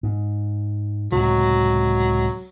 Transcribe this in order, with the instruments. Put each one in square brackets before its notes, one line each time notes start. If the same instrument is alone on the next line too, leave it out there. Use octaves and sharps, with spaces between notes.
[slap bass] G#2
[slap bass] C#2 A2 C3 [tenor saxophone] F#3